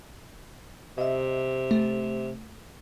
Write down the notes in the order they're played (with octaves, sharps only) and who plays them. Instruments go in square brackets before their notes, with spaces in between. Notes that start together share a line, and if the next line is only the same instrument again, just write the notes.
[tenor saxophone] C3 [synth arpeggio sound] D#5 E5
[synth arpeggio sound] A3